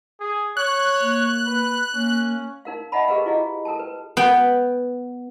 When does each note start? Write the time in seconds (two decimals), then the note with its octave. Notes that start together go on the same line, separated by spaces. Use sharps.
0.20 G#4
0.57 C#5 F#6
1.01 A#3
1.46 B4
1.94 A#3 C#4
2.65 D#4 A#4 F5
2.92 D#5 E5 F#5 A5 B5
3.08 G4 G#4 A#4 B4 D#5 F5
3.26 E4 F4 G#4 D#5 F5
3.65 A4 A#4 G5 A5
3.80 B4
4.17 B3 G5